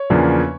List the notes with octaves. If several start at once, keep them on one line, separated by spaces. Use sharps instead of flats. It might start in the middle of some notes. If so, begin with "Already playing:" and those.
Already playing: C#5
E2 C#3 F3 A#3 D4